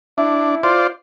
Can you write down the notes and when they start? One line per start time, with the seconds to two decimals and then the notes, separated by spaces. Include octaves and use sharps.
0.18 D4 E4
0.63 F4 C5 D5